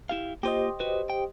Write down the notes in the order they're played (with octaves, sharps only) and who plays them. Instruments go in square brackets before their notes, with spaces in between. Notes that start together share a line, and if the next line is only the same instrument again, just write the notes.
[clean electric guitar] E4 G4 F5
[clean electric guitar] A#3 F4 [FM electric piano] G4 C5 D#5
[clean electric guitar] F#4 B4
G5